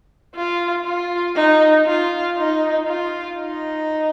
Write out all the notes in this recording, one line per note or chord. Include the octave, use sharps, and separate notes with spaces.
F4
F4
D#4
F4
D#4
F4
D#4